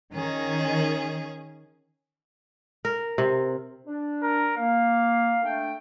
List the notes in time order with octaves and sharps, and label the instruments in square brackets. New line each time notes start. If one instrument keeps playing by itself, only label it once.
[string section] D#3 [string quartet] C#4 G#4
[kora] A#4
C3
[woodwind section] D4
[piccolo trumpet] A#4
[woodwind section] A#3 [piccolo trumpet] F5
[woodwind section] A3 D4 G5